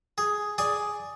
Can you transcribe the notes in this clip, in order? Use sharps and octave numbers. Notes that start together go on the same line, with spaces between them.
G#4
G#4 D5 G#5